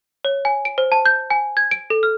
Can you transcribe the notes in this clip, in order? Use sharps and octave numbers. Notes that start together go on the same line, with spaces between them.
C#5
G#5
D7
C5
A5
G6
G#5
G#6
D7
A4
F6